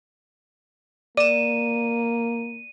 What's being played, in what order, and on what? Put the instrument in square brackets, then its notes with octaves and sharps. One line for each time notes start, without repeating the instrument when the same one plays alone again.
[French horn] A#3 [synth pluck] D5 E7 [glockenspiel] D#7